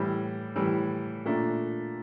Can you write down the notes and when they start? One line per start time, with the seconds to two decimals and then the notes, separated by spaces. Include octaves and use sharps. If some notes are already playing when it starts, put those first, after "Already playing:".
Already playing: A2 E3 G3
0.56 A2 E3 G3
1.25 A#2 A3 D4